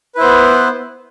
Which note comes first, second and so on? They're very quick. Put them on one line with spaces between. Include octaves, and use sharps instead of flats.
B4 E4 C5 B3